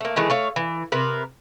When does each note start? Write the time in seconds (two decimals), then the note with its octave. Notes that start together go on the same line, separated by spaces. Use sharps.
0.01 A3 A#3
0.16 D#3 E3 G#3 A3
0.30 A3 C#5 F5
0.56 E3
0.92 C3 A#4 B4